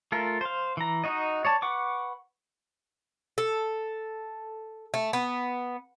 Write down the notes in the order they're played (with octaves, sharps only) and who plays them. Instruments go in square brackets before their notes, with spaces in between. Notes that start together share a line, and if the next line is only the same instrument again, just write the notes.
[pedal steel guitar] A3 F4 A4 A#4
C5 F5
E3 A#5
D#4 F#4 D#5
C#5 D5 A5
B4 F#5 C#6 D6
[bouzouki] A4
A3
B3